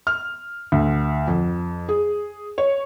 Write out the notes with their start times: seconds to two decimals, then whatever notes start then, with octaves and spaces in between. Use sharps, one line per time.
0.07 F6
0.72 D2
1.28 F2
1.89 G#4
2.58 C#5